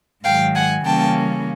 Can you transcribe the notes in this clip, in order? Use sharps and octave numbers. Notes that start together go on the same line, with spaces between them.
G#2 D#3 F#3 F5 G5
F#5 G#5
C#3 E3 G3 A#3 C#4 G5 A5